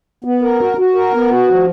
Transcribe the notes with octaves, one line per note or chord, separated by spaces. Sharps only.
B3
A#4
F#4
F#4
A#4
B3
F#4
F3